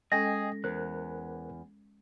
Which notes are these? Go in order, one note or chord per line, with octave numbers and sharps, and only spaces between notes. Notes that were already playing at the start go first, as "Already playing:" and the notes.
G#3 C#4 G#4 A4 D#5 G5 G#5 A#6
E2 A#4 C5 F#6